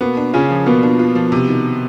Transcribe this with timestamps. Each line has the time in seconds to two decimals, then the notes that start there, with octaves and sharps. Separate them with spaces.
0.01 B2 A#3 B3
0.17 D4
0.33 C#3 C#4 F4
0.51 F3
0.66 B2 A#3 B3
0.83 D4
0.99 F4
1.15 F3
1.32 C3
1.48 D#3